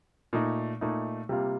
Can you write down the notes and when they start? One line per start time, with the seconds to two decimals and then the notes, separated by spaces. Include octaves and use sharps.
0.33 A#2 A3 D#4
0.81 A#2 A3 D#4
1.29 C3 G3 A#3 F4